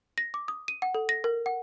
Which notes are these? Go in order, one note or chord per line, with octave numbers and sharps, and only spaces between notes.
A#6
D6
D#6
D#7
F#5
A4
A#6
A#4
F#5